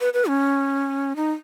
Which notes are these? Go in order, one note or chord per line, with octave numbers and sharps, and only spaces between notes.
B4
B4
C#4
D#4